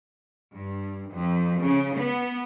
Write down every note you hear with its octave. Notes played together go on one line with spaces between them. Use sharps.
G2
F2
C#3
B3